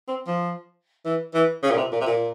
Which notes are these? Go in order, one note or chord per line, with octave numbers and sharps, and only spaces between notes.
C4
F3
E3
E3
C#3
A#2
C3
A#2
C3
A#2